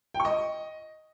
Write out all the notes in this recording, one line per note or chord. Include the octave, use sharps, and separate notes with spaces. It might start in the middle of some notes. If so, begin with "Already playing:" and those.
G5
C#6
D#5